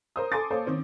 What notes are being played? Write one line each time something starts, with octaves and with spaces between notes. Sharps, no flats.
A#4 C5 D#6
A4 G#5 C6 D6 A6
A#3 A4 C5 C#5
D#3 C4 C#4